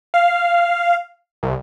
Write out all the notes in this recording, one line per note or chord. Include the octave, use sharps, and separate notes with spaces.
F5
C2